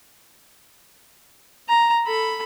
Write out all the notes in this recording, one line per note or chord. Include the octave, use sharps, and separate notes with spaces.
A#5
A4 B5